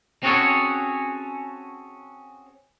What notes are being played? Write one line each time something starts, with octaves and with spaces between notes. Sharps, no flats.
C4 C#4 F#4 G#4 A4 C#5